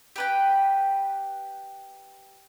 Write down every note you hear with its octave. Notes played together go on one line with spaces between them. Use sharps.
G4 B4 G5